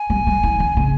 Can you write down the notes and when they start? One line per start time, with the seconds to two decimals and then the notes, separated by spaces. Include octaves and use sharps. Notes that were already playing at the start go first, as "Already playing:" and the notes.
Already playing: G#5
0.10 G3
0.27 G3
0.43 E3
0.60 D#3
0.77 C#3